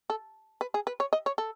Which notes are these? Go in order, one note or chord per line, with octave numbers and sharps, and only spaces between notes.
A4
B4
G#4
B4
C#5
D#5
C#5
A4